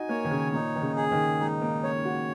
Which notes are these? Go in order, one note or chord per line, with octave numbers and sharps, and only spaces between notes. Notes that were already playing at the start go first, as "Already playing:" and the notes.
Already playing: D#4 F#4 G#5
A#3 C#5
D#3
C#3
A#2 D#4
D#3
C#3
G#4
D#3
G#3 D#4
A#3
C#4 C#5
F#4